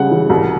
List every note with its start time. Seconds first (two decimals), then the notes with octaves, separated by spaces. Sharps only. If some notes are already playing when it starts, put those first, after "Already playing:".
Already playing: C#2 C#3 G3 F#5
0.11 E3
0.29 C2